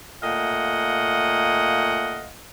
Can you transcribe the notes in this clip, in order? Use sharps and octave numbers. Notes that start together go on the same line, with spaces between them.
A#2 A3 D#5 F5 F#5